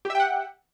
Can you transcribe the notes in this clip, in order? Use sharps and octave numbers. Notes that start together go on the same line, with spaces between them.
G4 E5 F#5 G5